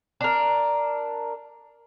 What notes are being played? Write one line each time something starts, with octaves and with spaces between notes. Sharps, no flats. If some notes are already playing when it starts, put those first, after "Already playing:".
D4 A#4